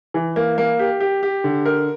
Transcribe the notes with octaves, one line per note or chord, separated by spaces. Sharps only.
E3
A#3
A#3
G4
G4
G4
D3
A#4